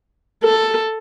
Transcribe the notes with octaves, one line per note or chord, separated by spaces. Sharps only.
A4